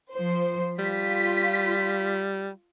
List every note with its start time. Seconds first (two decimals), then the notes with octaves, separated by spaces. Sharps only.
0.13 F3 C5
0.79 G3 F4 B6